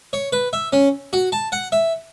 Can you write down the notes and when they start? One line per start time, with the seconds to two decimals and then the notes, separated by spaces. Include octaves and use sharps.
0.13 C#5
0.33 B4
0.53 E5
0.73 C#4
1.13 F#4
1.32 A5
1.52 F#5
1.72 E5